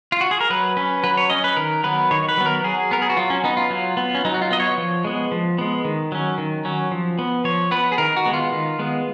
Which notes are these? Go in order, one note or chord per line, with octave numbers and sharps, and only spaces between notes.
F4
F#4
G#4
A#4
F#3 B4
C#4 B4
F#3 B4
C#5
C#4 D#5
B4
D#3 A#4
F#3 B3 B4
D#3 C#5
B4
F#3 B3
A#4
F#3 G#4
B3 A#4
G#4
F#4
F#3 F4
C#4
B3 D#4
F4
F#3
B3
C#4
F#3 D#4
F#4
F4
B3 D#5
C#5
F3
G#3 B3
F3
G#3 B3
D#3
F#3 C#4
D#3
F#3 C#4
F3
B3
F3 C#5
B3 B4
G#4
D#3 A#4
F#4
G#3 B3
F4
D#3
G#3 B3